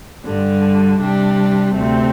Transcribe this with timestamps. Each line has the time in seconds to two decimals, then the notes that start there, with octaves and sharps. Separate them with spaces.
0.23 G2 D3 G3
0.99 C3 G3 D4 G4
1.75 D2 C3 A3 C4